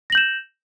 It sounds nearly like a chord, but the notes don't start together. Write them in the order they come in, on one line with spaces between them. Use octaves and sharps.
A#6 F#7 G6 E7